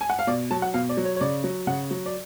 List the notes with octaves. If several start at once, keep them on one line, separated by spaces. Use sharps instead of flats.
G#5
F#5
F5
B2 D5
F#3 A5
F#5
B2 F5
D5
F#3
C#5
C#5
C#3 D5
F#3
C#3 F#5
F#3
D5